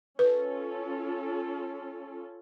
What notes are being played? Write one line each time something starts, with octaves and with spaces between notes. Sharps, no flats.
C#4 F4 A4 B4